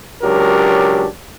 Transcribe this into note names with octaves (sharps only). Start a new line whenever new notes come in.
C#2 F#3 D4 G4 A#4